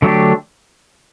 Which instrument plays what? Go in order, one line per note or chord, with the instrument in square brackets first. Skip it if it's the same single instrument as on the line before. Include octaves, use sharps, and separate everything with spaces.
[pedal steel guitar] D3 F#3 A3 D4 G4